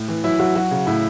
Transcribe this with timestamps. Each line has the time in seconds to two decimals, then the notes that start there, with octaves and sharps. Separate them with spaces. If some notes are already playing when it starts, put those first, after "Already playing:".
Already playing: A2
0.08 E3
0.24 F#3 E4
0.39 F#3 F#4
0.55 F#3 F#4
0.71 C#3
0.87 A2 E4